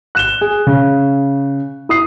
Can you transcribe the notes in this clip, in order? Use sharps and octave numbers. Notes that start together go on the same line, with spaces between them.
F#6 E7 G7
G#4
C#3
E4 D#6 C7